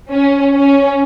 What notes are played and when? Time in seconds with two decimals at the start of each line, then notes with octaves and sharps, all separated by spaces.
0.11 C#4
0.55 C#4